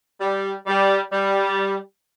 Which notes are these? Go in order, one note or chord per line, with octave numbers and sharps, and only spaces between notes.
G3
G3
G3